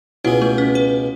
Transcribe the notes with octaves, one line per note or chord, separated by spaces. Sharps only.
C#2 B2 G#3 E4
A3
C#4
B4